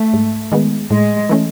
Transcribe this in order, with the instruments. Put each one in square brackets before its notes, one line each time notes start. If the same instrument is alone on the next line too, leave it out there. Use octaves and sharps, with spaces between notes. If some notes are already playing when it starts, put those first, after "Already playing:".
Already playing: [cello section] A3
[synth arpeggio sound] G#2
D#3 G#3 B3
[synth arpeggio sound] A2 [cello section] G#3
[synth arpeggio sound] E3 A3 C#4